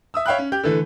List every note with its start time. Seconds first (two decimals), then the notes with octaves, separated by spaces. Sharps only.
0.14 E5 D#6 E6
0.26 C#5 E5 F5 G5 B5 F#6
0.38 C#4
0.52 G4 G6
0.63 D3 E3 A3